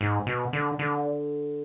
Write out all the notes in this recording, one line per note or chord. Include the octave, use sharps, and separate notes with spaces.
G#2
B2
D3
D3